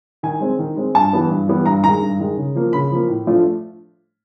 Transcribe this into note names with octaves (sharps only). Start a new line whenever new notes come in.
D#3 G#5
G#3 C4
D#3
G#3 C4
G2 A5
E3 G3 B3
G2
E3 G3 B3
G2 A#5
D#3 G#3 A#5
G2
D#3 G#3
C#3
F3 A#3
C#3 B5
F3 A#3
A2
F3 A3 D4 F4